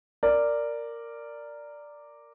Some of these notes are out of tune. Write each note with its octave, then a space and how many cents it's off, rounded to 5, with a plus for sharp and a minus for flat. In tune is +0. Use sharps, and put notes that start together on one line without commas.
A#4 -10 D5 +0